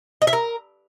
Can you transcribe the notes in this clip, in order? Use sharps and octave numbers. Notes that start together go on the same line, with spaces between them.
D#5
E5
A#4